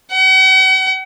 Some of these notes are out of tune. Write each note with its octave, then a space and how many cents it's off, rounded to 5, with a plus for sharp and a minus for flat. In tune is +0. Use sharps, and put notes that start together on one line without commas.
F#5 +40